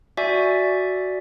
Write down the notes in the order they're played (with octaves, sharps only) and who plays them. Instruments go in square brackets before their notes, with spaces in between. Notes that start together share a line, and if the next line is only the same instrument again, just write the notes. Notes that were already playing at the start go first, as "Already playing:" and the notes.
[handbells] F#4 D5 E5 G#5